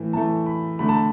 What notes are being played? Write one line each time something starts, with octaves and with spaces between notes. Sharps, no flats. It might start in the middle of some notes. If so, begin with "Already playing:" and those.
Already playing: A2 E3 A3
A2 E3 A3 A5
B5
D3 A3 B5
A5